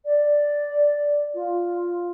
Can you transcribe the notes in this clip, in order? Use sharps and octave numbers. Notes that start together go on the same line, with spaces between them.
D5
F4